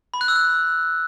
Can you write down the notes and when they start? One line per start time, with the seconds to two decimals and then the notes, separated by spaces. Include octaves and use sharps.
0.14 B5
0.21 F#6
0.28 E6
0.36 F#6